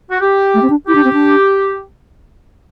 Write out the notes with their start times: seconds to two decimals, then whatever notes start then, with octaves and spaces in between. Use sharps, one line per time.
0.10 F#4
0.21 G4
0.54 A3
0.62 C4
0.70 D4
0.88 E4 G4
0.95 D4
1.04 C4
1.13 D4